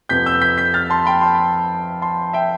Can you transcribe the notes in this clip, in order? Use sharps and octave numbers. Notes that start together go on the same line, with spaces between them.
F2 C3 F3 B3 G6 B6
E6 G6
G6 B6
G6 B6
F6 A6
A5 C6
G5 B5
A5 C6
A5 C6
E5 G5